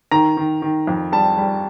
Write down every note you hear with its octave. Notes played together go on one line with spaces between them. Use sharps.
D#3 A#5
D#3
D#3
F2
G3 A5
G3